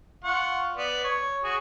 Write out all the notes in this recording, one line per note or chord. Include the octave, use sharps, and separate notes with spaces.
F4 F#5 C#6
B3 D5
C#5
F#4 G#4 C#5